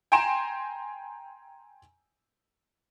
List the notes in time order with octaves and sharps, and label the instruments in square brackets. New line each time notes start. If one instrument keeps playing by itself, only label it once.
[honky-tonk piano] G5 G#5 A#5 C6 D7 E7